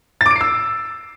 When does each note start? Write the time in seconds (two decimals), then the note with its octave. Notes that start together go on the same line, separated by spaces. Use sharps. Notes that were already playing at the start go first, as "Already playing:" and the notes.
0.21 A6
0.26 D6
0.31 D7
0.36 C7
0.41 E6